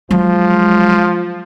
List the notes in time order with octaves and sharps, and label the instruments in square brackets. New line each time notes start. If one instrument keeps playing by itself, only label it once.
[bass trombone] F3 [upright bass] F#3 [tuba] G#3